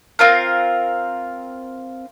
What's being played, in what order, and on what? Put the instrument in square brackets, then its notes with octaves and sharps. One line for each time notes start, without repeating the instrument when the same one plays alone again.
[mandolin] C4 F4 A#4